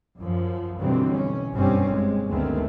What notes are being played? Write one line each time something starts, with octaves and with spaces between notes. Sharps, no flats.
F#2 F3
B2 D3 E3 F#3 G3 C4
C#4
F#1 G2 B2 G3 C4 C#4
G#3
D2 D#3 G#3 A3 B3 C4